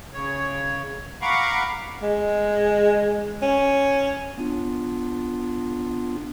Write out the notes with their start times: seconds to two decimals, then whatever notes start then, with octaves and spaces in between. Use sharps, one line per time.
0.14 C#3 C#5
1.22 F5 F#5 A#5 B5 C#6 D6
2.03 G#3
3.42 C#4
4.38 B3 D4 F4